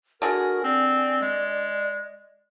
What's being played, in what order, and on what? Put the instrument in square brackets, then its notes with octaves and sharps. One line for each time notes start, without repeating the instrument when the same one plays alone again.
[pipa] D3 G#4 [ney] F#4 [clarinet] A#4
[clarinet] C4 [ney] D5
[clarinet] G#3